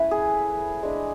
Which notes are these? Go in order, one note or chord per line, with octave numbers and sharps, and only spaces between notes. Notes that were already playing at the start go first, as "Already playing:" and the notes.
Already playing: A3 C#4 E4 B4
G#4
G#3 D4